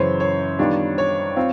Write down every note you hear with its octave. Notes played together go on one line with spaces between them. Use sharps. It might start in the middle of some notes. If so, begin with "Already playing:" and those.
Already playing: F#2 C#3 E3 C5 C#5
C#5
D#3 G3 B3 D4 F4
C#5
C4 F4